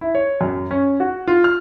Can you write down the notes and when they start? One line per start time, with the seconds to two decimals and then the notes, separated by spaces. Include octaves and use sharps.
0.01 E4
0.15 C#5
0.41 F#2
0.71 C#4
1.00 F#4
1.28 F4
1.44 F6